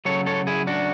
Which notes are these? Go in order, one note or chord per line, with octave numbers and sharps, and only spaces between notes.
C#3 F#3 A4 C#5
A4 C#5
E4 G#4
D4 F#4